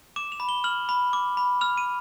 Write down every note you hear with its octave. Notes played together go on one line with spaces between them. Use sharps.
D6 E7
F7
B5
G7
F6 F#7
B5
D6
B5
F6 F7
D#7